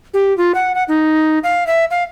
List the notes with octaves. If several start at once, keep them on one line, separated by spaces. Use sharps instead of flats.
G4
F4
F#5
F#5
D#4
F5
E5
F5